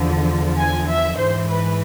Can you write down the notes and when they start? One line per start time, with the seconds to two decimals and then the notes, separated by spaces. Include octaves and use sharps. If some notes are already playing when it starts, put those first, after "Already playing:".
Already playing: E2 D3 F3
0.57 G#5
0.88 E5
1.18 G#2 E3 C5
1.48 B4